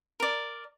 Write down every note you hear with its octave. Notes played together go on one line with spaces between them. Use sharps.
A#4 D5